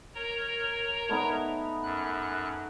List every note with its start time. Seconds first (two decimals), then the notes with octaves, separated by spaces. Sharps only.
0.15 A#4 C#5 A#5
1.09 A3 B3 D#4
1.83 F#2 F#6